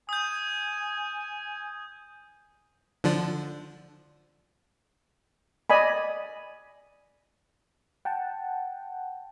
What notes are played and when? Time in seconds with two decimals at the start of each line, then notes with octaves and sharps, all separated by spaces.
0.09 G#5 D#6 G6
3.04 D3 F3 D4
5.70 D5 D#5 G#5 B5
8.05 F#5 G5 A5